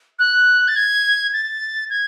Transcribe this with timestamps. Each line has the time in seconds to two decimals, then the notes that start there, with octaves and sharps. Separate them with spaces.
0.19 F#6
0.68 A6
0.76 G#6
1.33 A6
1.90 G#6